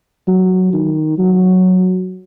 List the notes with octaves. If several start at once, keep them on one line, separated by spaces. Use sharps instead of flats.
F#3
D#3
F#3